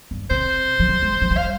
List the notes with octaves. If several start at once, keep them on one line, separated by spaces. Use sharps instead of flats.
G2
C3 C5
F3
G3
G#3
F3
G3
F5